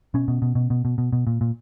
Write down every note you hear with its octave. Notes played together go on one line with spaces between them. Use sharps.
B2 C#4
B2
B2
B2
B2
B2
B2
B2
A#2
A#2